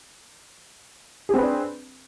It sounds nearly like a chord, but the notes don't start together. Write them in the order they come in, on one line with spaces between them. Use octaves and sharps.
G#4 C4 B4 D4